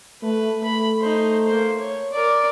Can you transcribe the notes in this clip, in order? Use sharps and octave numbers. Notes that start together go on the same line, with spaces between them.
A3 B4
A3 B5
D#4 C5
A#3 C5
C#5
A#4 D5